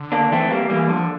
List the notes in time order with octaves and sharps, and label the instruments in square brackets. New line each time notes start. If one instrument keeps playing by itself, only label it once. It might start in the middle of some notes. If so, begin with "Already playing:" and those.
Already playing: [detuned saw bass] D3
[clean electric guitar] A#3 D4
[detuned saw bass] E3 [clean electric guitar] A3 C4
[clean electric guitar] G3 A#3
[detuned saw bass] E3 [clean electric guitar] G3 A#3
[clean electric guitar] D3 [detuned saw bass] F3